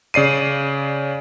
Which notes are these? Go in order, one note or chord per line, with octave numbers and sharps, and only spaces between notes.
C#3 D5 C7 D#7